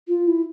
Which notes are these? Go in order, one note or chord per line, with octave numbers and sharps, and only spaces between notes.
F4
E4